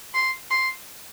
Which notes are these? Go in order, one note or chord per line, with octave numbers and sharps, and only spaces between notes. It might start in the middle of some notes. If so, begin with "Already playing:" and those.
C6
C6